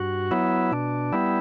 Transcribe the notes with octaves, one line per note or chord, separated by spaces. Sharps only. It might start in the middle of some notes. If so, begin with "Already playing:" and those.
Already playing: G2 F#4
F#3 B3 E4
B2 D4
G3 B3 E4